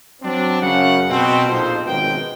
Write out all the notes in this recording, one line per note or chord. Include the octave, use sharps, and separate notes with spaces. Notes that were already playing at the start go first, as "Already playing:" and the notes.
F#3 C4 D4
F#2 C#3 F#5
B2 C4
A#1 F2 F3 D#4 C5
G#1 F#2 B2 G#3 G5